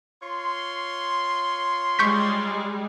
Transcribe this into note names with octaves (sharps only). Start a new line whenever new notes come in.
F4 C#5 C6
G3 G#3 C#6 G6 B6